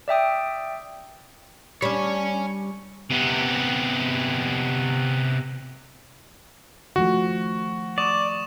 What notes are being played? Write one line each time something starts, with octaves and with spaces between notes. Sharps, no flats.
D5 E5 G5 D#6
G3 D4 C#5 G#5
C3 B3
D#3 F3 A3 F#4
D5 C#6 D#6 E7